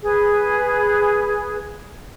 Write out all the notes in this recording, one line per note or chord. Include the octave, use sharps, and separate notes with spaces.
G#4 B4